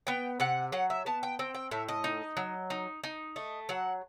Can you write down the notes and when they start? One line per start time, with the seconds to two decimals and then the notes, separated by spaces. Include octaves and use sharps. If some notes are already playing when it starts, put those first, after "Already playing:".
0.07 B3 G5
0.40 C3 F#5
0.72 F#3 F#5
0.90 E5
1.06 B3 A5
1.23 G5
1.39 C4 G5
1.55 G5
1.71 A2 E5
1.88 D#5
2.04 D#4
2.37 F#3
2.70 D#4
3.04 D#4
3.36 A3 D#5
3.69 F#3 F#5